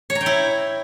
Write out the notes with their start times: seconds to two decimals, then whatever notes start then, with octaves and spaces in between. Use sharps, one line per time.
0.10 C#5
0.15 A#5
0.21 G5
0.26 E4